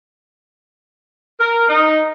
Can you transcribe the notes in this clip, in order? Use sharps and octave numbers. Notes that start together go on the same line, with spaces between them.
A#4
D#4